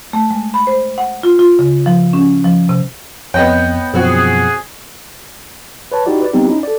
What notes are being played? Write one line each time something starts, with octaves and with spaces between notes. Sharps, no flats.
A3
G#3
B5
C5
F#5
F4
F4
C#3
F3
C#4
F3
C3
F2 B3 C#5 D#5 G5
F#2 B2 F3 C4 F#4 G#4
B4 C#5 A5
D#4 E4 F#4 G4 D5
B4 D5
G3 B3 C4 D#4 G4
C#4 D#4 E4
A4 D5